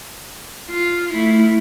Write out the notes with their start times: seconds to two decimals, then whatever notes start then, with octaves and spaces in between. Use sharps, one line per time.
0.70 F4
1.12 A3 E4